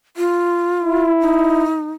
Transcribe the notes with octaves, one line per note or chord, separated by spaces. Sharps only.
F4
E4
D#4